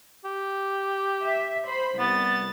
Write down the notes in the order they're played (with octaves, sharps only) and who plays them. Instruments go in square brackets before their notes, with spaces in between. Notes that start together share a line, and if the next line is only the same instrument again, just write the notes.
[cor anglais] G4
[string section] E5
C5 B5
[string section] C2 A6 [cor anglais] B3